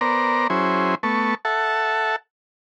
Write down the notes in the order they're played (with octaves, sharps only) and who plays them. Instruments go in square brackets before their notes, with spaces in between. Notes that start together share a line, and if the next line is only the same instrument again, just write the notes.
[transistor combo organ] B3 A#4 C5 D5 A#5
F#3 C#4 E4 G#4 C5
A3 B3 A5 C#6
A4 E5 F#5 A5